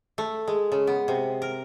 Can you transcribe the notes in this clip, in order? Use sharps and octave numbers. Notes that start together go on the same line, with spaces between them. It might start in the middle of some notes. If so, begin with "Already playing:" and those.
A3
G#3
C#3
B3
C3
A#4